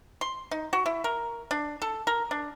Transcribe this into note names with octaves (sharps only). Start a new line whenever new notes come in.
C6
D#4
F#4
E4
A#4
D4
A4
A#4
D4